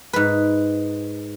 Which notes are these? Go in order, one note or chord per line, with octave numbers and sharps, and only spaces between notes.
G#2 B4